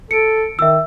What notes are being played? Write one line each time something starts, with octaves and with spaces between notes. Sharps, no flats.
A4 C#7 D7
D#3 E5 E6